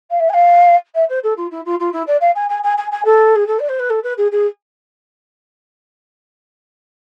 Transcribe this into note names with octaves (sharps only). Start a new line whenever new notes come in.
F5
E5
G#5
F5
E5
C5
A4
F4
E4
F4
F4
E4
D5
F5
G#5
G#5
G#5
G#5
G#5
A4
G#4
A4
D5
C5
B4
A4
B4
G#4
G#4